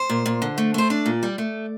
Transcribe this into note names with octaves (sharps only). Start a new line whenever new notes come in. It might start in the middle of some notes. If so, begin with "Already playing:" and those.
Already playing: C5
A#2
A#2
D3
A3
A3 C5
D4 D5
A#2
G3
A3